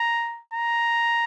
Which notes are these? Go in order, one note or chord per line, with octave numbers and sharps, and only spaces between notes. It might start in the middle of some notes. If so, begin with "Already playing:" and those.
Already playing: A#5
A#5